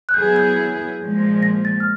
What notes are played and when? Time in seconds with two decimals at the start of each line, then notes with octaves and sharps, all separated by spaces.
0.09 F#6
0.14 F#3 B3 E4 G#4 G6
0.36 G6
1.00 A#2 F3 G#3
1.43 A#6
1.65 A6
1.80 F6